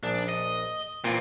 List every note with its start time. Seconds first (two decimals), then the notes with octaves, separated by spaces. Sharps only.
0.03 A#1 D4
0.29 D#5
1.04 A#2 E3 C4 F4